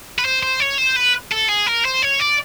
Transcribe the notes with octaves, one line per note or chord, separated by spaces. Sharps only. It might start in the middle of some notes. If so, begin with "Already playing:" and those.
B4
C5
C5
C#5
C5
B4
A4
G#4
A#4
C5
C#5
D5